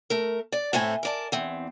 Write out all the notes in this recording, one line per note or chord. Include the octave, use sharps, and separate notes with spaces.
A3 A#4
D5
A2 A3 C4 G#5
A#4 D5 A5
E2 C4